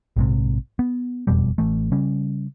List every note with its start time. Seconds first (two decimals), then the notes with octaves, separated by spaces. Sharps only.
0.16 A#1 G#2 C3
0.79 B3
1.27 E1 F2 B2 G3
1.58 A1 E3 A3
1.92 C#3 G3 C#4